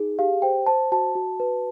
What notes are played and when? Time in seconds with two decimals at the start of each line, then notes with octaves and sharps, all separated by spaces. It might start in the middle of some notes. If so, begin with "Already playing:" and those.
Already playing: D#4 G#4
0.19 G4 F5
0.42 C5 G5
0.66 C5 A5
0.92 F#4 A5
1.15 F#4
1.40 B4